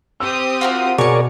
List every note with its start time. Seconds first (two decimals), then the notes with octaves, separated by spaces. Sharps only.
0.20 C4 G4 D#6 E6
0.61 F4 F#4 A#4
0.98 B2 G#4 A#4 C#5 D5 C#6